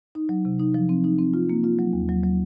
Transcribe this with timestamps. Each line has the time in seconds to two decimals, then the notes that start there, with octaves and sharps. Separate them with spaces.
0.15 D#4
0.29 F#3
0.45 C3
0.60 D#4
0.74 F3
0.89 C4
1.04 D#4
1.19 C4
1.34 F4
1.50 A#3
1.64 F4
1.79 F#3
1.93 D#2
2.09 F#3
2.24 F#3